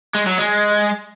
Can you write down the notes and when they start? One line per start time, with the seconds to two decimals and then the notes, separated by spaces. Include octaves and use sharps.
0.14 G#3
0.26 F#3
0.38 G#3